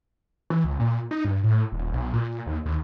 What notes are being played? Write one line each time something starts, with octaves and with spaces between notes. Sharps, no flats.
E3
C#2
A#2
D#4
G2
A2
D#1
B1
A#2
D#2
D#2